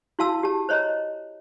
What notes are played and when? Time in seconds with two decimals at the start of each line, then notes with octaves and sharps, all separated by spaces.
0.19 E4 F#4 F5 A5 E6
0.43 G4 A5
0.69 C5 C#5 D#5 A#5